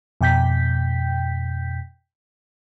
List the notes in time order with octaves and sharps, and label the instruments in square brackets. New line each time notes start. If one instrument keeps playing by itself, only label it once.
[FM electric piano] F2 B2 G5 G6 B6